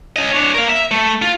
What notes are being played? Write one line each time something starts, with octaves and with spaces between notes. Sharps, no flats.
C#4 D#5
D4 C#5
A#4 F5
E5
A3
F4